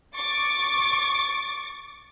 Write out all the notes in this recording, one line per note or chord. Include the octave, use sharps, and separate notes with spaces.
C#6 D6 A6 D7